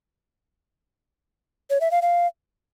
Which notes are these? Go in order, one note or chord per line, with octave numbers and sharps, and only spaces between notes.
C#5
E5
F5
F5